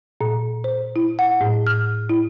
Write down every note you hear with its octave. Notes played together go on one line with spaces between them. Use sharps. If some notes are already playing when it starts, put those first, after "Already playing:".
A#2
C5
E4
F#5
A2
F6
E4